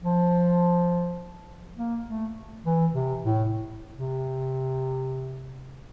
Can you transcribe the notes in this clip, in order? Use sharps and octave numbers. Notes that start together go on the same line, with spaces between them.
F3
A#3
A3
E3
C3
A2
C3